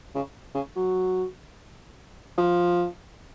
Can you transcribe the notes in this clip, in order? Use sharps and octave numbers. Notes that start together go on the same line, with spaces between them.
C#3
C#3
F#3
F3